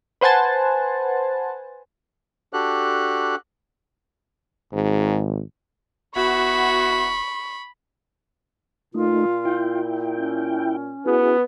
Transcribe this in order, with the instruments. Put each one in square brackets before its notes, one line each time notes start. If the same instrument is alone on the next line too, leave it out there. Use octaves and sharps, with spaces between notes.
[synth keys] B4 C5 F#5 G#5 A5
[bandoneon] D4 F#4 G4 A4 F#6
[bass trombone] G#1 [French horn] G#2
[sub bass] E1 [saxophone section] B3 E4 F#4 [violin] B5 [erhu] C#6
[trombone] A#2 [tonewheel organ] A3 D#4 [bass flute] F4
[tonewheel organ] E4 G5
[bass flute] C#4
[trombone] B3 [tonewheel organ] E4 F#4 G#4